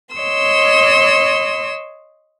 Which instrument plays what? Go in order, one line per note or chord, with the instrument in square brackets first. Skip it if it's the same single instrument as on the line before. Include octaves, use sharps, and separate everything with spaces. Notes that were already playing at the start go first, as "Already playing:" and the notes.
[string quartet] C#5 D#5 C6 E6